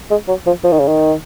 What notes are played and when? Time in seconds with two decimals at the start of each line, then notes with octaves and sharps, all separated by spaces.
0.10 G#3
0.28 F#3
0.46 F3
0.64 F3
0.72 D#3
0.80 C#3
0.88 D#3